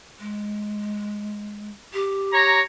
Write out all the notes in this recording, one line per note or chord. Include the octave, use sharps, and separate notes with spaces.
G#3
G4
C#5 A#5